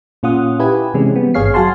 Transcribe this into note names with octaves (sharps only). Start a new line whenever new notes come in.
A#2 C#4 F4 F#5 D#6
E4 G4 B4 G#5
C3 E3 G#3 C4 C#4
G3 B3
G#1 G2 G#4 C#5 F5 C7
F#3 F#4 F5 G#5 A5 C6